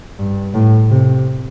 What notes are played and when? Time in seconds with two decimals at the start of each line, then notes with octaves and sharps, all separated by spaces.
0.19 G2
0.54 A2
0.90 C3